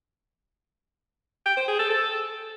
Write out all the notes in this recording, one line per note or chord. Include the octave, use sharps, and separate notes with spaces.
G5
C5
G#4
A4
A4